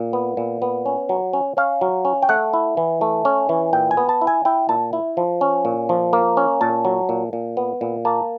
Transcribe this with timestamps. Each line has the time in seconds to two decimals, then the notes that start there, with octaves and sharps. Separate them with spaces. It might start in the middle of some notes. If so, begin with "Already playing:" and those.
Already playing: A#2
0.13 B3
0.37 A#2
0.62 B3
0.86 C#4
1.09 F#3
1.33 C#4
1.57 C#4 F5
1.81 F#3
2.05 C#4
2.22 G5
2.29 A3 F#5
2.53 E4
2.77 E3
3.01 A3
3.25 C#4
3.49 E3
3.73 A#2 G5
3.91 G#5
3.97 B3
4.09 A5
4.21 E4
4.27 G#5
4.45 E4 G5
4.69 A#2 A5
4.93 E4
5.17 F3
5.41 C#4
5.65 A#2
5.89 F3
6.13 A#3
6.37 C#4
6.61 A#2 A5
6.85 F#3
7.09 A#2
7.33 A#2
7.57 B3
7.81 A#2
8.05 A#3 A5